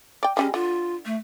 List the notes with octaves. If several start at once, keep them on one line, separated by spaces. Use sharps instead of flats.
D5 G5
F3 G3 G#3 C#4
D3 F4
A3